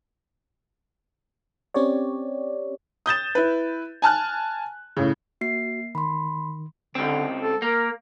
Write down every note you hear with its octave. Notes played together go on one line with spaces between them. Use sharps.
C4 C#4 G4 C#5 D5
D#6 G6 A6 E7
E4 B4
G#5 A5 F6 F#6
A2 C#3
A#3 F#4 C7
D#3 B5 C6
C#2 D3 C4
A4
A#3 A#4